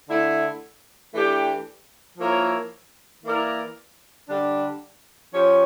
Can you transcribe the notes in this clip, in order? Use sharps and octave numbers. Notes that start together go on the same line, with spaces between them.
D3 A3 E4
E3 A3 D4 G4
F3 A#3 E4 A#4 C#5
E3 A#3 E4 A#4 D5
D3 G3 D4
F3 C#4 G4 C#5